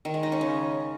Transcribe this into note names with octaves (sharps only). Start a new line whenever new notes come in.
D#3
G#3
D#4
C#4
C#3